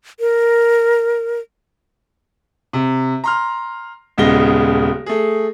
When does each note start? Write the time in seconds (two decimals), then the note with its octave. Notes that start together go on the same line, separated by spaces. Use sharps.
0.20 A#4
2.73 C3
3.24 A#5 C6 F6
4.18 D#1 C#3 G#3 B3 A#6 G7
5.06 A3 G#4